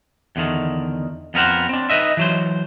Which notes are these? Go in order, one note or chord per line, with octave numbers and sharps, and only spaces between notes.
E2 D3 D#3
F2 B3 A#4 C5 F#5
C4 D4
D#4 B4 D#5 E5
E3 F#3 C5